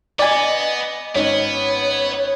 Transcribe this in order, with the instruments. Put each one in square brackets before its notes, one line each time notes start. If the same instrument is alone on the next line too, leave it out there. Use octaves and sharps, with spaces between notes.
[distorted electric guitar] B3 [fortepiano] D5 G#5 [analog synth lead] D#5
[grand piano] G#1 C#4 D#4 [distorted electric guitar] B3 B4 [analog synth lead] C#5